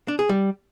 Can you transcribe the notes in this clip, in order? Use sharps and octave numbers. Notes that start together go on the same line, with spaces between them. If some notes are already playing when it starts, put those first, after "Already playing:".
D4
G#4
G3